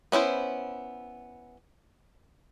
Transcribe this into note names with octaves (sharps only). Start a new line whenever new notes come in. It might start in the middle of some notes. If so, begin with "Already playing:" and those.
B3 C#4 E4 C5